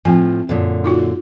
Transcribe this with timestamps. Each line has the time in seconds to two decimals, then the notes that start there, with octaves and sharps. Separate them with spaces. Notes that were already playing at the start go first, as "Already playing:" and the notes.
0.05 A2 F3 C4 G#5
0.49 F#2 A#2 D3
0.84 D#4 F4 F#4